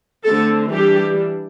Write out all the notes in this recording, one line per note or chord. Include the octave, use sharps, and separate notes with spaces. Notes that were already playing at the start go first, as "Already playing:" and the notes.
D3 A3 C4 A4
E3 G3 D4 G4